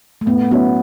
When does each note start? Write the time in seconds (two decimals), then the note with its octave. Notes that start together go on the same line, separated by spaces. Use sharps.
0.21 A3
0.26 A2 B3
0.51 F#3 B3 C#4 E4